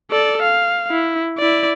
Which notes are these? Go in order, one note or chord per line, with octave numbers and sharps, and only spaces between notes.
A4 D5
F5
E4
E4 D5